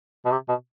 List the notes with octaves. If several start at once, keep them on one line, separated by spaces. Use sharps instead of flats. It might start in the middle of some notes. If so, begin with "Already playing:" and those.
B2
C3
B2